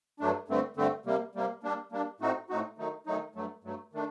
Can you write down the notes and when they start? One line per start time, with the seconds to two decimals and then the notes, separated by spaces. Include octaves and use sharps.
0.20 G2 F#3 A3 D4
0.48 G2 D3 A3 C4
0.76 G2 D3 A3 C4
1.06 C3 G3 A#3
1.35 C3 G3 A#3
1.63 G3 A#3 D4
1.92 G3 A#3 D4
2.20 A2 A3 C4 D#4 F#4
2.50 A2 A3 C4 D#4 F#4
2.78 D#3 F#3 A3 D#4
3.06 D#3 F#3 A3 D#4
3.35 G2 F#3 A3
3.64 G2 F#3 A3
3.93 D#3 A3 D4